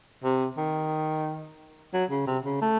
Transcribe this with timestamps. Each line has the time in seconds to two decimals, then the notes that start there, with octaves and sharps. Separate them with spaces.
0.24 C3
0.57 D#3
1.93 F#3
2.10 C#3
2.27 C3
2.45 C#3
2.62 A3